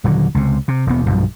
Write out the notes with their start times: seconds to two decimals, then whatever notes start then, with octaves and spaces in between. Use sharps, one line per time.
0.04 D#1 D3 F#3
0.35 C#2 C3
0.68 C3
0.87 E1 D#2 B3
1.07 B1 G2 F3